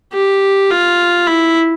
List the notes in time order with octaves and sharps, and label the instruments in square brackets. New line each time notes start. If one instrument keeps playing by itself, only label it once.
[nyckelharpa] G4
F4
E4